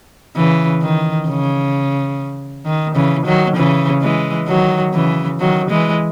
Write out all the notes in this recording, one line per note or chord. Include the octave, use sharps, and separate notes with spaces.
C#3 E3
D#3
C#3
D#3
C#3 E3
D#3 F#3
C#3 E3
E3 G#3
D#3 F#3
C#3 E3
D#3 F#3
E3 G#3